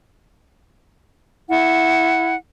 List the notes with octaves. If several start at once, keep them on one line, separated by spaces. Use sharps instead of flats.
E4 F#5